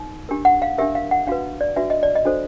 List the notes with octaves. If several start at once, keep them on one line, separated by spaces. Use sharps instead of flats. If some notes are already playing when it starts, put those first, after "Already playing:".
Already playing: D#4
D4 G4 A#4
F#5
F5
D4 G4 A#4 E5
F5
F#5
D4 F#4 B4 F5
D5
D4 F#4 B4 E5
D#5
D5
D#5
D4 F#4 A4 C5